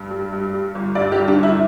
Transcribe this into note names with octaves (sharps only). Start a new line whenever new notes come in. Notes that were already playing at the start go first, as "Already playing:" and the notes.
Already playing: G2
G3
G2
G3
G1
G2 D5
G4
G1
D4
G1 E4